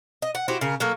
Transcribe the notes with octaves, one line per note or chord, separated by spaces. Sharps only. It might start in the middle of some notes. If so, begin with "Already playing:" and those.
D#5
F#5
E4 F#4 G4 C5
C#3 A#4
F#3 A#3 A4